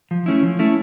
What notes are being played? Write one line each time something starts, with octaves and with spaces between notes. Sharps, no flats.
F3
A3 C#4 E4
F3
A3 C#4 E4